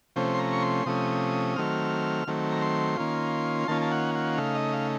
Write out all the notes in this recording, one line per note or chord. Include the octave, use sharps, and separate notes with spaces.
C3 F3 A3 C#4 C5
C6
A#5
C#6
C6
C3 F3 A3 C#4 D#6
D#3 F#3 A3 C4 F6
D#3 F#3 A3 C4
A#5
C6
D#3 A#3 C#4 F4
D#3 A#3 C#4 F4 A5
A5
F#5
F#5
C#3 A3 D#4 F5
D#5
F5